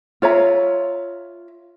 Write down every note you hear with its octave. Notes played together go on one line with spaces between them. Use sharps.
F4 C#5 E5 A#5